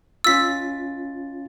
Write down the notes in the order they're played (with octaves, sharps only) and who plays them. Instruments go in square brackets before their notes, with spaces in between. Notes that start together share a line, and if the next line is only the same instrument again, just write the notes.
[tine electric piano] C#4 F4 A6 [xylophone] E6 B6